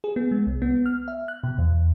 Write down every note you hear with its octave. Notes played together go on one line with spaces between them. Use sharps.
G#4
B3
G#3
C2
B3
F6
E5
F#6
B2
E2